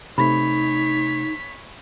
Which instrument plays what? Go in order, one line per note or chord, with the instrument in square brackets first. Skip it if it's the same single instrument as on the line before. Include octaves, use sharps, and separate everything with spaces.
[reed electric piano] C3 A3 [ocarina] D#4 [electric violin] C#5 B6 [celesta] B5